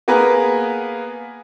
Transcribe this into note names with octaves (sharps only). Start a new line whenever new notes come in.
A#3 B3 G#4 A#4 B4